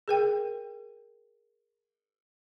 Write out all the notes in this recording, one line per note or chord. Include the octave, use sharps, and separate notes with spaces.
G#4 A#4 G5